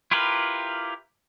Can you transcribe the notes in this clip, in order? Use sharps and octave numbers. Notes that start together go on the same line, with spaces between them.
E4 F4 G4 A#4 B4